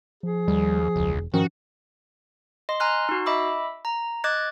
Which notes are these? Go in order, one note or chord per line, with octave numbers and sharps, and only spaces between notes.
F3 G#4
D#2 G3
E1 C#2
G#2 D#3 F3 C#4 F#4
D#5 C6
G#5 A#5 C6 F6 F#6
D#4 F#4
D#5 E5 B5 D6 E6
A#5
D#5 D6 F#6 G#6 A6